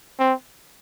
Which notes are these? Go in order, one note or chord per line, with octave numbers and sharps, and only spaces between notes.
C4